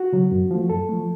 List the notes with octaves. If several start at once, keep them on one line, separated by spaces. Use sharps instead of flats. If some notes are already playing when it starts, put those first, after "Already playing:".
Already playing: F#4
C#3 F#3
F#2
F3 A3
F#2 A4
F3 A3